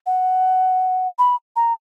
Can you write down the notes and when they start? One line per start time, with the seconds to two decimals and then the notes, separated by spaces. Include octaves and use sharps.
0.06 F#5
1.19 B5
1.56 A#5